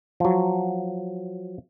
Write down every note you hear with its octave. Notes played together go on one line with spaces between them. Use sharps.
F3 F#3